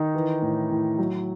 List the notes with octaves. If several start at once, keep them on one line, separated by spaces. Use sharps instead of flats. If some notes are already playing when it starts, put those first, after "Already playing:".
Already playing: D#3 D#4
E3
A2
A2
F#3